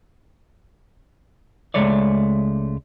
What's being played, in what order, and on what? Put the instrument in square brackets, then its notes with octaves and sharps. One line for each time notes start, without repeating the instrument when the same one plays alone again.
[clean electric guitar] C#2 G#3 A3 C#5 D5